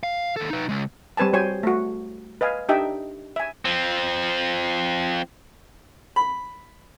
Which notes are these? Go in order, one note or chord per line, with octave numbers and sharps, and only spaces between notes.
F5
D#2 A4
D#4 B4
C#3 G#3
G3 C4 B4 G#5 A5
G3 F#4 C5 C#5 G5 G#5
A3 F#4
B4 D#5 F5 G#5
D4 D#4 G4 D#5 E5 G5
E5 G#5
F3 C4
B5